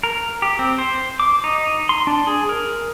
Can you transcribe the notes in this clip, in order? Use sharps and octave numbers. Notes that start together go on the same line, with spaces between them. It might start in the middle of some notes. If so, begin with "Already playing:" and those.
A#4
G4
C4
C5
D6
D#4
C6
D4
G#4
A#4